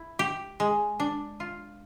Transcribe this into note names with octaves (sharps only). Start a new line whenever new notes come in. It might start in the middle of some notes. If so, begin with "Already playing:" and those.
Already playing: E4
G4
G#3
D4
F4